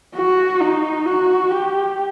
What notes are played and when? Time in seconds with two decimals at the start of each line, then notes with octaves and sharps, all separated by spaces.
0.16 F#4
0.61 D#4
1.06 F#4
1.51 G4